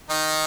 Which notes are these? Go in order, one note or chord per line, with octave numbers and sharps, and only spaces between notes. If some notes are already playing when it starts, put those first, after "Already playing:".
D#3 D#4